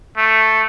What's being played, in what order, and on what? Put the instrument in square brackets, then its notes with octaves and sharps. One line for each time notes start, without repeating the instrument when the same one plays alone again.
[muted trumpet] A3